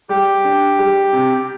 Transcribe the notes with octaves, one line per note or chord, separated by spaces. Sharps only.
G3 G4
D4
G3
C3